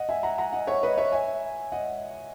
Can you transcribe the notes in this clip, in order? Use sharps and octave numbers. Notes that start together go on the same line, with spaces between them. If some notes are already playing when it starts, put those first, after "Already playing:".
Already playing: D#5 F#5
E5 G#5
F#5 A#5
F#5 A#5
D#5 F#5
C#5 E5
B4 D#5
C#5 E5
E5 G#5
D#5 F#5